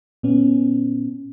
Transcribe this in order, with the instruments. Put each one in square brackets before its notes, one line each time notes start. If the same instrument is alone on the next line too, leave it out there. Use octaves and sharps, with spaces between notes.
[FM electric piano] A#2 B3 C#4